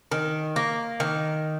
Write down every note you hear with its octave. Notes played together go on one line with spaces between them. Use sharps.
D#3
A#3
D#3